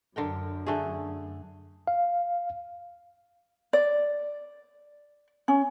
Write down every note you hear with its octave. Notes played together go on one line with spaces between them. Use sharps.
F#2 D3 A#4 G5
D3 A3 G#4
F5
D5
C#4